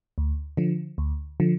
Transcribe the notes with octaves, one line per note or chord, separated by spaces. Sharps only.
D2
D3 F3
D2
D3 F3